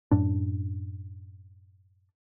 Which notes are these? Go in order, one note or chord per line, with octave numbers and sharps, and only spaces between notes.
F#2 A2 D4